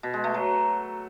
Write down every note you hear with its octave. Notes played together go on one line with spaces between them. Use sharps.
B2
G#3
A3
F#3